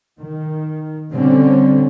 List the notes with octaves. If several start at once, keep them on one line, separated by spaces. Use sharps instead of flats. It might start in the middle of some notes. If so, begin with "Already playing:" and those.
D#3
B2 D3 G3 C4 C#4